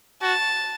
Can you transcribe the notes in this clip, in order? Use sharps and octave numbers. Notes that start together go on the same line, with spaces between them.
F#4 A5